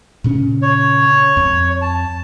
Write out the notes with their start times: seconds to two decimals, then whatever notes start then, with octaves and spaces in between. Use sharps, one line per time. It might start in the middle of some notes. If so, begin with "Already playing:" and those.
0.24 A#2 C#3 C#4
0.62 C#5
1.37 F2
1.82 A5